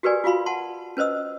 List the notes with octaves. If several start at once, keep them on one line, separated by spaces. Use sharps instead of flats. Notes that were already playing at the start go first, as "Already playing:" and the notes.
F#4 G4 A#4 B4 D5 G#5
F4 F#4 F5 B5 C6
F#5 A5 C6
C#4 B4 C5 D#5 E6